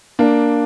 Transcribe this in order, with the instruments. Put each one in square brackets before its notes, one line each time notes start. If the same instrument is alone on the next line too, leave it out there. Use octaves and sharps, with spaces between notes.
[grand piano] A#3 D4